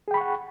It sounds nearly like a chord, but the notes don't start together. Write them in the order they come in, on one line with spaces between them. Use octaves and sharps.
G#4 G5 B5 C#6 F#5